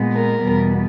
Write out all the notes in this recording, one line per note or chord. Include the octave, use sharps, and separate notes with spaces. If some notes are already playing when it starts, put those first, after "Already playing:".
Already playing: A#2 G#3 B3
A#4
E2 B2 G3 B3